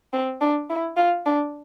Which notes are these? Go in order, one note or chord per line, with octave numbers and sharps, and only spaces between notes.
C4
D4
E4
F4
D4